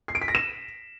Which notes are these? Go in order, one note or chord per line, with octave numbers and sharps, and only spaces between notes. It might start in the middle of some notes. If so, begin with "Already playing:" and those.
C7
D7
B6
A#6
E7